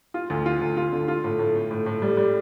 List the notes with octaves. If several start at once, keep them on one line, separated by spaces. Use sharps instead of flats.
F4
D2
F4
D2
F4
D3
F4
A2
A2
A3
A2
A2
G3
G3